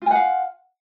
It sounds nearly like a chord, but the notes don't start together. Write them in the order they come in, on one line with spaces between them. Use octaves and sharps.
F4 G#5 F#5 F5